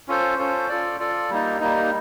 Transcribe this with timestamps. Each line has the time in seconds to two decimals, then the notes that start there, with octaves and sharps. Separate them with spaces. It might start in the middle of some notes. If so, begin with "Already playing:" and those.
0.08 C#4 F4 A4 C5
0.38 C#4 F4 A4 C5
0.69 F4 A4 D5
1.00 F4 A4 D5
1.30 G3 A#3 D#4
1.60 G3 A#3 D#4